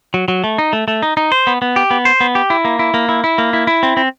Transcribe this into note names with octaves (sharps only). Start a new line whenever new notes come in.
F#3
F#3
A3
D#4
A3
A3
D#4
D#4
C5
B3
B3
G4
B3
C5
B3
G4
E4
A#3
E4
A#3
E4
E4
A#3
E4
E4
C4
C4